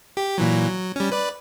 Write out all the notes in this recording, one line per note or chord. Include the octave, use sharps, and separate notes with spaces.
G4
A#2 E3 F#3
F#3
G3 C#4
B4 D5